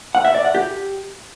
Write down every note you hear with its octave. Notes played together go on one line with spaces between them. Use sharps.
F#5
E5
D5
F#5
G4